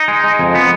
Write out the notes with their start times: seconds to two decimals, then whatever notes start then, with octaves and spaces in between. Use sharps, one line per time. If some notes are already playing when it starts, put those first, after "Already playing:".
Already playing: D#4
0.08 G#3
0.24 G#3
0.39 F2
0.55 B3